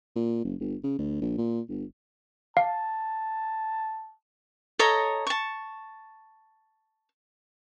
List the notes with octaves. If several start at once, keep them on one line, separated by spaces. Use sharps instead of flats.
A#2
F#1
G1
C#3
D2
A#1
A#2
G1
F5 A5
A4 C#5 D#5 A#5
A5 C#6